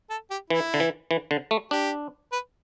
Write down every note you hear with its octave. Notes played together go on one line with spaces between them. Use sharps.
A4
G4
E3 E4
D3
E3
E3
D3
A3
D4 G4
B4